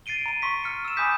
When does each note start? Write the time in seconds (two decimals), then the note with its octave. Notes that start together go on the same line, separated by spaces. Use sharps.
0.06 A6 C7 D7 D#7 G7
0.26 A#5 D#7
0.42 C6 C#6 B6
0.64 F6 C#7
0.85 E6 E7
0.97 G#5 B5 D6 D#6 G6 B6